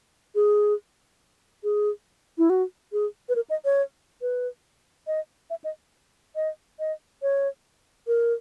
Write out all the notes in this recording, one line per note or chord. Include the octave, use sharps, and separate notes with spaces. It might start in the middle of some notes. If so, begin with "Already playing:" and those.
G#4
G#4
E4
F#4
G#4
B4
A#4
D#5
C#5
B4
D#5
E5
D#5
D#5
D#5
C#5
A#4